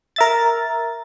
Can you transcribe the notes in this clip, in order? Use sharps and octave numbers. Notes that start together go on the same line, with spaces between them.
A#4 E5 A6